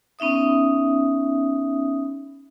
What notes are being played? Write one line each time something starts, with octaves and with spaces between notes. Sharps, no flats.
B3 C#4 D#4 E5 D#6